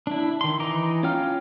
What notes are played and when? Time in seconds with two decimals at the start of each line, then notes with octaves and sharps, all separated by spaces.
0.07 D4 E4
0.41 D#3 C6
0.60 E3 D#4 A#5 D6
1.03 C#4 F4 F5 G5 F6